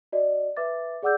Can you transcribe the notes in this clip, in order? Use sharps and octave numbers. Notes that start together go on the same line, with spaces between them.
F#4 D5 D#5
B4 E5 D6 A6
G#4 D5 F#5 D6 E6 G6